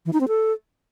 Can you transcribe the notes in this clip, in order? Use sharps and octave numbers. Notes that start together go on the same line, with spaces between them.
E3
D#4
C4
A4